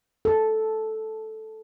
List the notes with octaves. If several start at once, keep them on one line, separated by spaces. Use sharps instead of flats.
A4